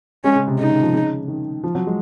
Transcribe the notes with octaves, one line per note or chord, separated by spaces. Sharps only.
G#3 C#4
C#3
C3
C#3 D#4
D#3
F3
C#3
D#3
F3
F#3
G#3